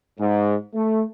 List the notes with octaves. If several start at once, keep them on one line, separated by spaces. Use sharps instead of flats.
G#2
A3